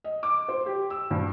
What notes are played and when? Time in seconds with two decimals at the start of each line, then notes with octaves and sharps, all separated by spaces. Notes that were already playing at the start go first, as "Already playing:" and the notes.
0.04 D#5
0.23 D6
0.48 C5
0.66 G4
0.90 E6
1.11 G2